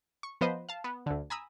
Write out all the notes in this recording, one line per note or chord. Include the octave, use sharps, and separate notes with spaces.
C#6
F3 B3 B4 C5 D#5
F5 A5
B3
D2 D3
G#5 A#5 B5 D#6 E6